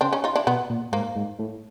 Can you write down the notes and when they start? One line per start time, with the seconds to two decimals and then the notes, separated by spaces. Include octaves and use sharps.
0.01 C#3 C4 D4
0.13 C#4 D#4
0.24 D#4 F4
0.36 D4 E4
0.47 B2 B3
0.70 A#2
0.92 G#2 A#3
1.16 G#2
1.39 A2